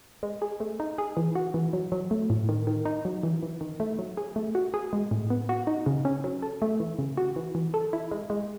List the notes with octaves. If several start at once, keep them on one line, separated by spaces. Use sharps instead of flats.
G#3
G#4
A3
D#4
G#4
E3
F#4
E3
F#3
F#3
A3
A2
D#3
D#3
D#4
F#3
E3
E3
D#3
A3
F#3
G#4
A3
F#4
G#4
G#3
A2
B3
F#4
D#4
C#3
C#4
F#3
A4
A3
E3
C#3
F#4
E3
E3
A4
E4
G#3
G#3